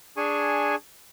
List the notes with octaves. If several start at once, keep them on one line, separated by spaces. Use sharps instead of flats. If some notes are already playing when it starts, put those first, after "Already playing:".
D4 G#4 G#5 C#6